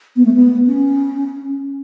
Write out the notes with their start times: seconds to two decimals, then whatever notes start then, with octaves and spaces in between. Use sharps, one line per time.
0.16 B3
0.25 A3
0.34 B3
0.67 C#4